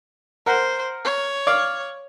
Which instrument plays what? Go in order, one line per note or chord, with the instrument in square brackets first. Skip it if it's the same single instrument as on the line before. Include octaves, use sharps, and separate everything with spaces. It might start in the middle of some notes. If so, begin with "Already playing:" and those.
[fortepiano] A#4 F#5 [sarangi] C5
[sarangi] C#5
[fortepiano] D5 F5